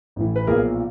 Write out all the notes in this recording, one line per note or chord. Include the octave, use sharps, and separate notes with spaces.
A1 A2 E3
B4
B1 A#2 F3 G#4 A#4